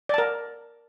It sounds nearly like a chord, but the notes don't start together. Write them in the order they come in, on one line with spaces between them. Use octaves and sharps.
D5 A5 A#4